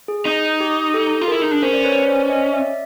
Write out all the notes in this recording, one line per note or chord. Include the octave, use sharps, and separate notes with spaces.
G#4
D#4
G4
G4 A4
F4
E4 G#4 A#4
D#4
D4
C#4 A#4 C5
D5
B4 C#5
C5 D5
C#5 D#5
D5 E5